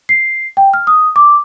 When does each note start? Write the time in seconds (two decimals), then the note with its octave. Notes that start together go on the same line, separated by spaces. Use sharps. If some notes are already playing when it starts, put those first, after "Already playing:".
0.09 C7
0.57 G5
0.74 F6
0.87 D#6
1.16 D6